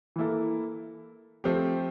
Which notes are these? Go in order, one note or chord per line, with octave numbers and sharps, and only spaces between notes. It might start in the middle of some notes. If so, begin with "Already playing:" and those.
E3 A#3 E4 A4
F3 A3 C4 G4